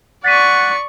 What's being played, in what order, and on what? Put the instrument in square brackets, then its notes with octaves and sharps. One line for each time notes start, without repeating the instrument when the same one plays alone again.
[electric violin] D5 C#6 [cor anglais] F#5 [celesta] A6 B6 D#7